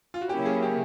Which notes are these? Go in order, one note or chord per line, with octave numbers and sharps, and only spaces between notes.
F4
F#4
C#3 F#3 A#3 C#4 E4 G4
G#4
G4